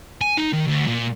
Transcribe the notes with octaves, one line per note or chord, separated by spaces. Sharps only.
G#5
D#4
D#3
D2
A#2